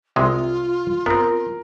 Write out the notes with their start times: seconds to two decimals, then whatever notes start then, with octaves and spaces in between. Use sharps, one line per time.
0.16 C2 C3 G#3 F4
1.06 B3 C4 A#4